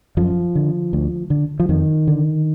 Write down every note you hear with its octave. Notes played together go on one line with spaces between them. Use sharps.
F#2 F3
D3
D2
D3
F3
F2 D#3
D3